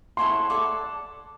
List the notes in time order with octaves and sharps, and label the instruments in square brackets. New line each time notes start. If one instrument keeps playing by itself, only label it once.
[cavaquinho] E4 A4 C#5 F#5 [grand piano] C6
[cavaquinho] A4 D5 F#5